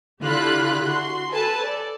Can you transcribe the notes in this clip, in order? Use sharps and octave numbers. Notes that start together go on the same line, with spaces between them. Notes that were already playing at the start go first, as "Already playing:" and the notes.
D3 E4 F4 G4 B5 F#6
F#4 C6
A4 B4 G#5 A5
A4 D5